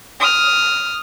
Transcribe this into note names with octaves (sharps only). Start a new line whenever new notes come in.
D#6 F6